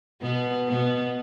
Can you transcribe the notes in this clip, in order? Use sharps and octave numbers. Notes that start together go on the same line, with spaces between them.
B2 B3
B2 B3